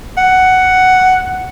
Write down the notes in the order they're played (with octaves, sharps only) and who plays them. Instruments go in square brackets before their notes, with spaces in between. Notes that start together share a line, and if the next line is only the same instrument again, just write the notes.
[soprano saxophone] F#5